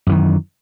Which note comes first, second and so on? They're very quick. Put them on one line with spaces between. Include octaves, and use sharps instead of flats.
F#2 E3 D#3